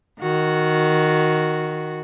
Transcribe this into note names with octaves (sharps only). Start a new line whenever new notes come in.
D#3 F#4